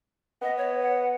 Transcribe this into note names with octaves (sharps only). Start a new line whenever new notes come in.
B3 D#5
C#5
F#5